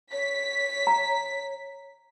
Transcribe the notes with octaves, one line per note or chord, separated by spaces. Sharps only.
C#5 B6
A#5